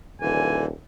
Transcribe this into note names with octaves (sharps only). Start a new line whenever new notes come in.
D#1 D3 E3 G#5